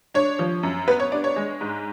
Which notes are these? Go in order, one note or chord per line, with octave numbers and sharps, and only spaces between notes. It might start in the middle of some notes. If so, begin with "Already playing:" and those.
D4 C#5
F3
F#2
B3 B4
C#5
D4 D5
C#5
G#3
G#2